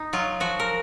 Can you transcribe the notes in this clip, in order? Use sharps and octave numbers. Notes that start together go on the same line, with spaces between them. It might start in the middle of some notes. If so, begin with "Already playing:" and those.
Already playing: D#4
F#3 F4
F3 F#4
A#4